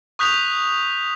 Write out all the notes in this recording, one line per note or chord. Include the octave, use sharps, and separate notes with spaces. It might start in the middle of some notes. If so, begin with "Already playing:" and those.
C#6 D#6 F#6 G6 B6 F7